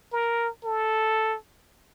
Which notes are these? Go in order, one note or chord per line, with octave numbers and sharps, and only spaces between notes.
A#4
A4